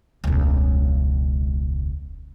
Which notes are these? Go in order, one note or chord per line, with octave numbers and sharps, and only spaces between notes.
E1 C#2